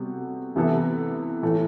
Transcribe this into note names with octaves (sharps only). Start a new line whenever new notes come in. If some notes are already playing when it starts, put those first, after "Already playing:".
Already playing: C3 G3 B3 F#4 A4
C3 E3 B3 E4 A4
A2 E3 A3